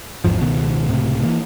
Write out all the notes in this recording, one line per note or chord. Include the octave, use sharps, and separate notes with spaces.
A1 E2 G#2 F3
C#2 B2 D#3 B3
C#2 A2 C3
E3 A#3